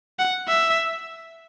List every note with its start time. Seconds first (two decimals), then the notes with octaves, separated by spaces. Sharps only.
0.19 F#5
0.48 E5